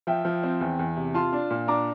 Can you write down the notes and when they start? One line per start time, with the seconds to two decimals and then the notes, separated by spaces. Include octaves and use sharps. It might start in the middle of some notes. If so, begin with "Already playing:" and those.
0.07 F3 E5 G5
0.25 F3
0.43 C4
0.61 E2
0.79 E2
0.97 C3
1.14 F4 A5 C6
1.33 D4
1.50 A#2
1.68 D4 A#5 D6